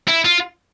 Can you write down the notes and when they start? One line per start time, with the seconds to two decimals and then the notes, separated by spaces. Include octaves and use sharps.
0.08 E4
0.25 F4